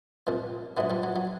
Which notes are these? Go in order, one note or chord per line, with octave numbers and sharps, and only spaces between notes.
C2 A#2 F3
A#1 G#2 E3 F#3
F3 G3
F#3
F#3